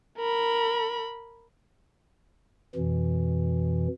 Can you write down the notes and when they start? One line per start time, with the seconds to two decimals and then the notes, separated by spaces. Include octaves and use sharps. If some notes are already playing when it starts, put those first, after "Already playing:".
0.18 A#4 B5
2.75 F2 B2 E3